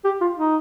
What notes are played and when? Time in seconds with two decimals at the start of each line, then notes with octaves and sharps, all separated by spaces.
0.04 G4
0.21 F4
0.37 D#4